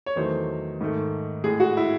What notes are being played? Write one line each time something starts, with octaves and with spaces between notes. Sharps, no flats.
C#5
E2 D#3 F#3 A3 C5
G#2 D#3 A3
A2 G#3 G#4
F#4
E4